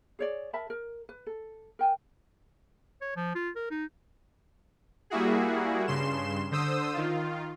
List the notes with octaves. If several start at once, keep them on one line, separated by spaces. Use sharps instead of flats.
G#4 C#5 D5
A#4 E5 A5 B5
A#4
B4
A4
A#4 G5 G#5
C#5
F3
F4
A#4
D#4
G3 A#3 E4 F#4 G#4
G2 C#3 C6 E7
D3 C5 D#6 E6
D#3 F4